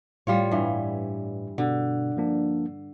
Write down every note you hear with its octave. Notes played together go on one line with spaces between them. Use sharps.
A2 G3 F4 C#5
G2 E3
B2 D3
F3 A#3 D4